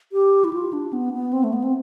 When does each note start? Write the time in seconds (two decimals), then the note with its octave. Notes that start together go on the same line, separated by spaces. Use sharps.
0.12 G4
0.44 E4
0.53 F4
0.73 D4
0.93 B3
1.14 B3
1.33 C4
1.44 A3
1.53 B3
1.63 C4